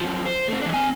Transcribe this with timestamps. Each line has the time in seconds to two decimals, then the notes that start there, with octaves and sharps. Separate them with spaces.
0.01 F#2 F3
0.26 C5
0.49 A3 C4
0.62 E3 D4
0.74 C4 G#5